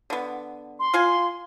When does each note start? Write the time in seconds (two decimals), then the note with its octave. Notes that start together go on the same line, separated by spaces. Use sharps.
0.10 D3 B3
0.79 C6
0.94 F4 F5 G#5